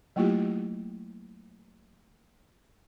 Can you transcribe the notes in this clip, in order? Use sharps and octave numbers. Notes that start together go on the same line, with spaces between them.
F#3 A3 A#3 E4 F4 G4